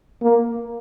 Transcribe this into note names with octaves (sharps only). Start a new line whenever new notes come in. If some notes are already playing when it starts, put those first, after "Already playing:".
A#3